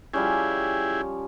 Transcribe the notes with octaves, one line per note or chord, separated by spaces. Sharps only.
F3 G3 C#4 E4 G4 G#4